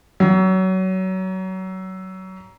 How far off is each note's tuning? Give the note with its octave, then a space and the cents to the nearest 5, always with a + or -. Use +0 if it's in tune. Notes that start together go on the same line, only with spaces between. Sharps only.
F#3 +25